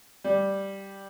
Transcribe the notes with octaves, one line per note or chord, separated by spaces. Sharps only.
G3